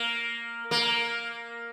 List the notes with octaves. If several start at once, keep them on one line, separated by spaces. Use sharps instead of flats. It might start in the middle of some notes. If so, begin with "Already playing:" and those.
Already playing: A#3
A#3